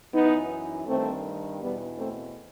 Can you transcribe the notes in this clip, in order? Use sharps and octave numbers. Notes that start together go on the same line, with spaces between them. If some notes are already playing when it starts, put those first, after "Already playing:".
F#2 E3 B3 D#4
G2 D#3 A3 C4
E2 B2 G3 B3
A3 C4